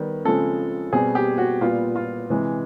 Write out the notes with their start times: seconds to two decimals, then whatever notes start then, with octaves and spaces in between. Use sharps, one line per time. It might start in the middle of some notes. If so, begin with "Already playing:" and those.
Already playing: D#3 G3 B3
0.25 C#3 F3 G#3 C4 A4
0.93 B2 G3 C4 G#4
1.15 G4
1.38 F#4
1.61 A#2 G3 B3 F4
1.96 F4
2.30 C3 E3 G#3